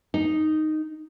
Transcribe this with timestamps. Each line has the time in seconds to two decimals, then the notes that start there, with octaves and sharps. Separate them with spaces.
0.14 D#4